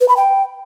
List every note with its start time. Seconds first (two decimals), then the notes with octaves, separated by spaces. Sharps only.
0.01 B4
0.09 B5
0.17 G5